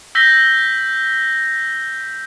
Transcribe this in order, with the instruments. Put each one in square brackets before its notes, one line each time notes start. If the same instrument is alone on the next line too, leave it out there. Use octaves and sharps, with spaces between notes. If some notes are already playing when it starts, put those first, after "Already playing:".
[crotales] E6 G6 A#6 B6 G7